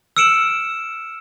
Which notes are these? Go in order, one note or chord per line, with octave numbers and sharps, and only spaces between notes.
E6 F6 C#7 D7 E7 F#7